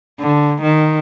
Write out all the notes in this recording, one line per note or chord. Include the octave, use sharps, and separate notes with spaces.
D3
D#3